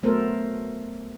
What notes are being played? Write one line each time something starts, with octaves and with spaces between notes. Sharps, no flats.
F#3 A3 B3 A4 A#4 C5